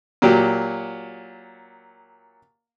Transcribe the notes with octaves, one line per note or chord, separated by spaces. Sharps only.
A#2 F#3 G4